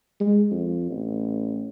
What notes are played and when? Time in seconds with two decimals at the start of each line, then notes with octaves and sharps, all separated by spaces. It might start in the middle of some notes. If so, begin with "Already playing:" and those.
0.20 G#3
0.51 F2
0.90 A1